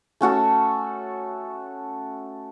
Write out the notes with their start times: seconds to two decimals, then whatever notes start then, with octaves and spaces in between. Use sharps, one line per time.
0.21 A3 C#4 F#4 A4